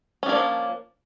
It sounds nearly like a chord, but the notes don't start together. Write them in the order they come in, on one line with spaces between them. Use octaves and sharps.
C#4 D4 A#3 F#3 F3